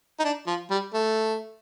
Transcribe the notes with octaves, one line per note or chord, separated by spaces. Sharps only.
D#4
D4
F3
G3
A3